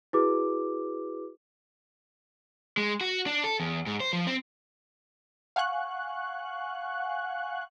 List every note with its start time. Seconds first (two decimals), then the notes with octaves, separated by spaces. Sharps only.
0.13 E4 F#4 G#4 B4 D6
2.77 G#3
3.01 F#4
3.26 D4
3.44 A4
3.60 E2
3.86 G#2
4.00 C5
4.13 F3
4.27 C4
5.56 F5 F#5 G#5 C#6 F#6